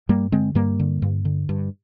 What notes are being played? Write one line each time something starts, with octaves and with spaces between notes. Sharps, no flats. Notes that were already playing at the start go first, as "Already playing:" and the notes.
G2 G3 A#3
D3 G#3 C4
G2 G3 A#3
D3
G2
D3
G2